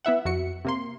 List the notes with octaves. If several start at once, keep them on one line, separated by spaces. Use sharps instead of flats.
B3 E4 E5 F#5
F2 F#4 C#7
C3 A#3 C6